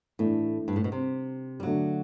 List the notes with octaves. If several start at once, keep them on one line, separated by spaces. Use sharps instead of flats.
A2 E3 A3 D4
G2
A2
B2
C3
G3
D3 F#3 A3 D4 F#4